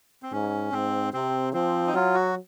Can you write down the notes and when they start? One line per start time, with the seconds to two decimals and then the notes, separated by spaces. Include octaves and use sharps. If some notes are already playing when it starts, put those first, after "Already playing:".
0.23 C4
0.32 G#2 C#4
0.72 G#2 C4
1.13 C3 C4
1.53 F3 C4
1.87 D#4
1.94 F#3 F4
2.14 F#4